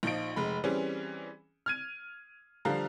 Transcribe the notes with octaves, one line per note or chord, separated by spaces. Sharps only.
A#1 F3 D#4 D7
F1 G#3 B5
E3 G3 C4 C#4 G#4
F6 G#6 D#7
D3 F3 G3 F5 A#5